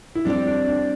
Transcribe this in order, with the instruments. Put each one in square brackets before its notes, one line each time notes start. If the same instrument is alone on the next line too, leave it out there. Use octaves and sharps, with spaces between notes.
[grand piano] E4
[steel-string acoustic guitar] G3 C4 G4 D5 [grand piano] D4
[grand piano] D4
D4